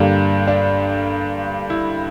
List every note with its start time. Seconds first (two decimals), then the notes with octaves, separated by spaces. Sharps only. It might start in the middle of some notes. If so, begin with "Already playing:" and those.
Already playing: G2 D3 G3 A#3 D4
0.48 D4
1.70 E4